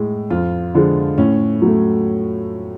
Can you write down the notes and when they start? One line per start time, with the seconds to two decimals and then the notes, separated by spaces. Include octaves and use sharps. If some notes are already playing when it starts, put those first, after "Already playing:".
Already playing: A2 G#3
0.30 F2 F4
0.75 D3 F3 G#3
1.18 A2 C#4
1.62 F#3 A3